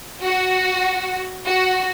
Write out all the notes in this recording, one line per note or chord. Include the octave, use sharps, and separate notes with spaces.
F#4
F#4